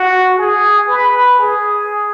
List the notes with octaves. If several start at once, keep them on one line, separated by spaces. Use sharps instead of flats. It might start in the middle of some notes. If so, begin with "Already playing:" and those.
Already playing: F#4
G#4
B4
G#4